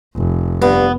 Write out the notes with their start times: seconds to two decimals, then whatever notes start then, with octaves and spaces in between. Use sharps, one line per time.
0.16 F1
0.62 G2 B3